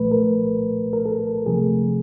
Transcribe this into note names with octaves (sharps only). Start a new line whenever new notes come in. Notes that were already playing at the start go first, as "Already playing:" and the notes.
Already playing: C2 A#2 F3 A3 B4
A#4
A#4
A4
D2 C3 F3 A3 G#4